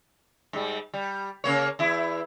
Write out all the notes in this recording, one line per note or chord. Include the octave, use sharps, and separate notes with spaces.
G#2 G3
G3
C#3 A#3 C#5
E2 E4